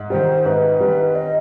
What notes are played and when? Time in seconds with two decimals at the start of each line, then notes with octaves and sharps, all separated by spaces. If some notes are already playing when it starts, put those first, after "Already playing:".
Already playing: G#2
0.10 D#3 G3 C5
0.45 G#2 B4
0.79 D#3 G3
1.15 D#5